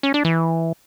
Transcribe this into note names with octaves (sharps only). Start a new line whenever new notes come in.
C#4
D4
E3